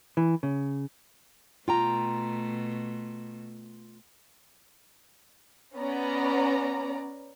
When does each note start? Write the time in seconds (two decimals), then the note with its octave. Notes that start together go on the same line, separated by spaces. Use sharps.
0.17 E3
0.43 C#3
1.68 B2 A3 F4 G5 A#5
5.76 B3 C#4 D5 A#5